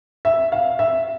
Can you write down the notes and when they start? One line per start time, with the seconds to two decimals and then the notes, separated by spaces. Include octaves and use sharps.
0.25 E5
0.52 F5
0.79 E5